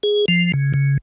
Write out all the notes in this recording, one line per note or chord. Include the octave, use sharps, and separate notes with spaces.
G#4
F3
C#3
C#3